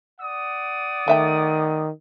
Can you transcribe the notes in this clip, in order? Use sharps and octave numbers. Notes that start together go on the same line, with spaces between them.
D5 F#5 D#6
D#3 A3 E5 G5